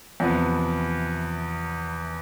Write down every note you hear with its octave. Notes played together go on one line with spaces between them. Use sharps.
E2 C3 F3 B3